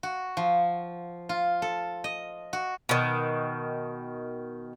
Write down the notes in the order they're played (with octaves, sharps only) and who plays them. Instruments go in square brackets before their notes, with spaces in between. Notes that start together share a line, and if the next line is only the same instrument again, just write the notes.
[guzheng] F#4
F3
F4
A4
D#5
F#4
[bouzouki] B2 D#3